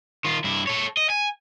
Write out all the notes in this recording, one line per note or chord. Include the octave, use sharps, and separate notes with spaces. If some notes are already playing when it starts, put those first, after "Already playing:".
D#3 F4
G2 E4
A4 C#5
D#5
G#5